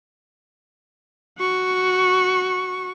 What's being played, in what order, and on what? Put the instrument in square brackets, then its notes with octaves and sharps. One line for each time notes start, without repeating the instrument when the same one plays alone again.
[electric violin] F#4 C#6